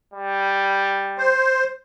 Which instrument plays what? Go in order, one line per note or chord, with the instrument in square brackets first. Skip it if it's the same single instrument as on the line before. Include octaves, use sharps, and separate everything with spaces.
[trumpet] G3
[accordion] C5